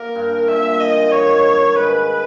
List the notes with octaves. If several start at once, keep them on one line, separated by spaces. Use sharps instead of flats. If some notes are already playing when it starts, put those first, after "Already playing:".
Already playing: A#3 A#4
G2
A#2 E5
A#2 D#5
D#3 C#5
D#3
G#2 B4